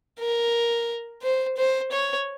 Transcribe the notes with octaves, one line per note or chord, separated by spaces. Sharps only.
A#4
C5
C5
C#5